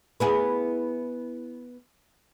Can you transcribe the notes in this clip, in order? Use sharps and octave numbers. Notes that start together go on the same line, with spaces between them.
B3 E4 G#4